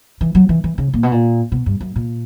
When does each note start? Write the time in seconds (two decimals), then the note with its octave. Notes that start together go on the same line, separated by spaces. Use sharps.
0.21 E3
0.35 F#3
0.49 E3
0.64 E3
0.78 C#3
0.94 A#2
1.03 B2
1.12 A#2
1.52 B2
1.66 G2
1.80 F#2
1.96 A#2